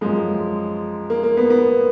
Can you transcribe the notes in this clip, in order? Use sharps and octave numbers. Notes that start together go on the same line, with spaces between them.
F#2 F3 G#3
A#3
A#3
B3
B3